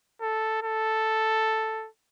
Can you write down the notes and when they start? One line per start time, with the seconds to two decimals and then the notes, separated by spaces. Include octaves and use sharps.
0.21 A4
0.63 A4